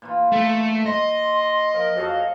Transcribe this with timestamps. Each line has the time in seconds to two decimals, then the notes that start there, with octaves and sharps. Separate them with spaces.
0.02 A#2 E3 F4
0.32 A3
0.86 D#5 C6
1.74 F3 A#4
1.96 F2 F#3 F#4 G#4 A4 F5